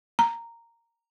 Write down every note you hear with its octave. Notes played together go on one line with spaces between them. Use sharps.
A#5